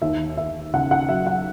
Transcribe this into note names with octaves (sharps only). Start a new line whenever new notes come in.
D#2 E5
D#2 E5
C#3 F#5
F#5
F#3 E5
F#5